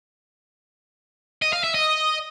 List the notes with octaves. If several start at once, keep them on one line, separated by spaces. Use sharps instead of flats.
D#5
F5
E5
D#5